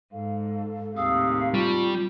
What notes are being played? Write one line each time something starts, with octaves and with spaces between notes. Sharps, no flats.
G#2 A4 F5
D#2 A2 C3 G#4 F5 D#6 E6
G3 F4 A5 C#6